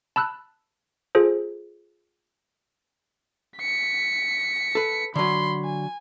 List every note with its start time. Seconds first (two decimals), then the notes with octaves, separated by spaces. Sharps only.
0.16 A5 B5 E6 F#6
1.15 F4 G#4 A4 C5
3.60 B6 C#7
4.75 A4 B4
5.16 D3 F#3 B5 C6
5.64 G#5